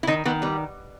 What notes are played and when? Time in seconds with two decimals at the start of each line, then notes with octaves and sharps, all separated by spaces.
0.03 E4
0.07 D#3 D#4
0.25 D#3 B3
0.42 G3 B3